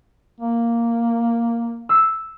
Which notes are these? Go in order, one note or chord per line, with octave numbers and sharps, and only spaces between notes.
A#3
E6 C7